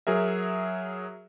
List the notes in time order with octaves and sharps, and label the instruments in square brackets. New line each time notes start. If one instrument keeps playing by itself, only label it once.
[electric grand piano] F#3 G#4 A#4 E5